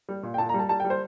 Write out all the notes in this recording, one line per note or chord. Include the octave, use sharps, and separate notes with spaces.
G3
A#2
G5
A#2 A5
A#5
G3
A5
G3 A5
G5
G3
C5